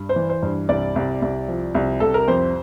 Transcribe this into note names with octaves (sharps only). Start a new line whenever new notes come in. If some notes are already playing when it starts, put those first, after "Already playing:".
Already playing: G2
C5
E3
C5
G2
C2 D5
C2
C2
F3
C2
C2 A4
A#4
F2 C5